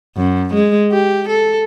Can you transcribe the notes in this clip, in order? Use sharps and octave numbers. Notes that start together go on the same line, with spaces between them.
F#2
G#3
G4
A4